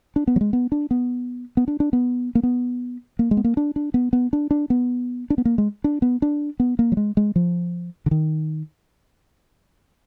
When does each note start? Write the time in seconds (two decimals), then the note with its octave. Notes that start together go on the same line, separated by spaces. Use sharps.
0.16 D4
0.27 B3
0.36 F#3
0.41 G#3
0.53 B3
0.72 D4
0.91 B3
1.57 B3
1.68 D4
1.80 D4
1.93 B3
2.35 A#3
2.43 B3
3.19 A#3
3.31 G#3
3.37 B3
3.44 A#3
3.57 D4
3.76 D4
3.94 B3
4.13 B3
4.33 D4
4.51 D4
4.70 B3
5.30 D4
5.38 B3
5.45 A#3
5.58 G#3
5.84 D4
6.02 B3
6.22 D4
6.60 B3
6.79 A#3
6.92 F#3
6.97 G#3
7.17 G#3
7.36 F3
8.06 D3
8.11 D#3